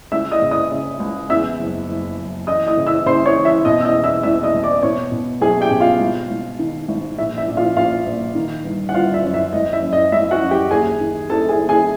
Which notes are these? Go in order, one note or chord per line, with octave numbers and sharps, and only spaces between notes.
C#2 E5 E6
D#5 D#6
C#3
D#5 D#6
C#3
C#2
E2 E5 E6
F#1
F#1
F#1
E3 D#5 D#6
D#5 D#6
C#3
E5 E6
C#3 C5 C6
C#5 C#6
E3
E5 E6
B2 D#5 D#6
E6
D#5 D#6
E2
E5 E6
E1 E5 E6
D#5 D#6
E1
D5 D6
B2 C#5 C#6
B2
B1 G#4 G#5
G4 G5
B2
F4 F5
G#1
G#1
D#3
G#1
A#1 E5
E5
A#1
F4 F5
A#1 F4 F5
A#1
D#3
G1
F#5
G1 F4 F5
E5
F#2
E5
G#1 D#5
E5
F#2
D#5
G#1 E5
F#4 F#5
F#2
G4 G5
D#2 G#4 G#5
D#3
D#2 A4 A5
G#4 G#5
D#2
G#4 G#5